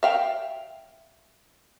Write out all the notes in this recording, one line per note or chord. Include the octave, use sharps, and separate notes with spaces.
E5 F5 G5